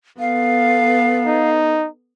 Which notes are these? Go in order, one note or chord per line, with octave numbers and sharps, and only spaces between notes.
B3 A4 F5
D#4